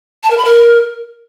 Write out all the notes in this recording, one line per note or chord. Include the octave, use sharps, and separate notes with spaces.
A5
A#4
B5
A#4